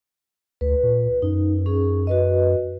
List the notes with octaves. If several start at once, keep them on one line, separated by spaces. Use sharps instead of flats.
D2 B4
A#2
F#2 D#4
C#4 G#4
F#4 B4 D#5